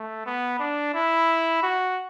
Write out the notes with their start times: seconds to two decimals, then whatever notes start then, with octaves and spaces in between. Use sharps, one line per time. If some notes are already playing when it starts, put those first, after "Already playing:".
Already playing: A3
0.26 B3
0.60 D4
0.95 E4
1.63 F#4